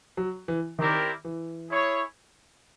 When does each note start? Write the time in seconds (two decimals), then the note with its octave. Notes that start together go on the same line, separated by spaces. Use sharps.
0.17 F#3
0.48 E3
0.78 D#3 C4 E4 G4 A#4 D5
1.25 E3
1.71 E4 G#4 C#5